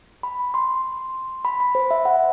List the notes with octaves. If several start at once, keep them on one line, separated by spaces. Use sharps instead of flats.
B5
C6
B5
B5
C5
E5
F#5